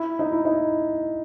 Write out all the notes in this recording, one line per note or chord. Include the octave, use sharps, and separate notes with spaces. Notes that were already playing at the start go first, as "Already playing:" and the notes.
Already playing: E4
D#4
E4
D#4